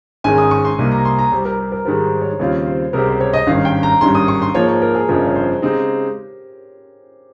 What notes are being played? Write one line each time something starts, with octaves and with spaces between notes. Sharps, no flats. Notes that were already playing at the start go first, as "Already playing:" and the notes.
G#1 G#2 D#3 G#3 C#4 G#5
D#6
C#6
C6
C2 C3 G3 A#3 D#4
A#5
C6
A#5
C2 C3 G3 C5
A#4
A#4
A#4
G#2 D#3 G3 A#4
C5
C#5
D#2 C#3 G3 C4 F4 C#5
C5
C#2 C3 G3 C4 G4 A#4
C5
C#5
D#5
G#1 G2 D#3 G3 C#4 F5
G5
A#5
G#1 G2 D#3 G3 C#4 C6
D#6
C#6
C6
G#2 F3 A#3 C#5
C#5
A#4
G#4
G1 F2 C#3 F3 A#4
C#5
C5
C#3 G#3 C4 D#4 G4